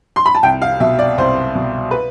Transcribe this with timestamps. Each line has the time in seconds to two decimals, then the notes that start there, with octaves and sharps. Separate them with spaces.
0.16 C6
0.26 B5
0.35 A5
0.43 C2 G5
0.62 F5
0.80 B2 E5
0.99 D5
1.18 C2 C5
1.55 B2
1.91 B4